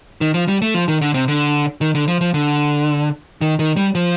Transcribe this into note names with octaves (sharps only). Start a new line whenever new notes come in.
D#3
F3
G3
A3
F3
D#3
D3
C3
D3
D#3
D3
F3
F3
D3
D#3
D#3
G3
F3